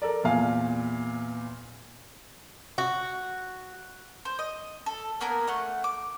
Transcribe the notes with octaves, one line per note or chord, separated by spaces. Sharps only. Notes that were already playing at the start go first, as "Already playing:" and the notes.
A4 A#4 D5
E2 A#2 F5 G#5
F#4
C5
D#5
A4
A#3 B3 A#4 G#5
A3 C#4 F#5
D6